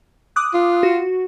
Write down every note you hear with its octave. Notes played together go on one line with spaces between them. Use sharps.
D6 D#6 F#6
F4
F#4